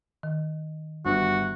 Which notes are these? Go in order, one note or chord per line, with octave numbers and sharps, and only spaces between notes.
D#3
G1 F#4